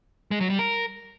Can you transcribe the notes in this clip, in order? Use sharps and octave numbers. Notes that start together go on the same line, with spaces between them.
G#3
F#3
G3
A#4